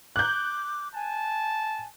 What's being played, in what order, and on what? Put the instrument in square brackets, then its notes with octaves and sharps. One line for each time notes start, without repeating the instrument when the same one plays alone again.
[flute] D6 [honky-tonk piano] F#6 G6
[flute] G#5 [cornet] A5